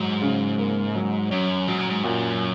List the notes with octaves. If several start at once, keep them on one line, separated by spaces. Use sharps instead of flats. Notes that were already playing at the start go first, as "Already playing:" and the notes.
Already playing: G#2 F#3
C#3
A#3
F#3
F#2 C#4
G#2 F#3
A#2
G#2
F#2 A#2